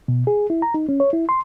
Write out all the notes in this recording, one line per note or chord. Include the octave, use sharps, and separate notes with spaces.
B2
G#4
E4
A#5
D#4
C#4
C#5
E4
C6